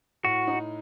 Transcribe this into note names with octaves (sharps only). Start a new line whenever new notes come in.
A2 F#4
D#4